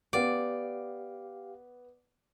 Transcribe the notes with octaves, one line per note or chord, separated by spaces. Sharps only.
B3 G4 D5 F5 F#5